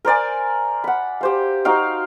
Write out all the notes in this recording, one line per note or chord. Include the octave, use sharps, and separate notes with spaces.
A#4 C5 D5 G#5
F#5 B5
G4 C5 F5
D#4 F#4 F5 G5